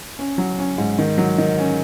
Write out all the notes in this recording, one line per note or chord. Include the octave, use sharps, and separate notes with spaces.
C#4
F#3
C#4
G#2
D#3
F#3
D#3
C#4